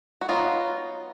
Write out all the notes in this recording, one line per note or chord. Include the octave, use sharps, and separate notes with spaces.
F#4
F#3 B3 D#4 F4